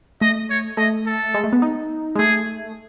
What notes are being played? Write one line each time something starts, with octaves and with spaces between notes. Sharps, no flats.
A3 D#5
C#5
A3 D#5
A4
G#3
A3
B3
D#4
G#3
A3 G#4